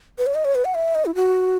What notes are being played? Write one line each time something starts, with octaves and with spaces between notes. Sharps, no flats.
B4
C#5
D#5
C#5
B4
F#5
E5
D#5
E4
F#4